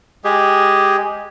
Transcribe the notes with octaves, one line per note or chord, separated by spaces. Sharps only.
G#3 G4 G#4